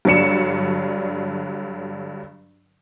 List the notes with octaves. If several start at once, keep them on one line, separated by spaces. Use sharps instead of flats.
G2 D3 F#3 D4 C#7 E7